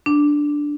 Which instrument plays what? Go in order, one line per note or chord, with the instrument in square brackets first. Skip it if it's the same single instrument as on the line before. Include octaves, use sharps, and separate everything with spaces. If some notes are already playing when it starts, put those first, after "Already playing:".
[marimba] D4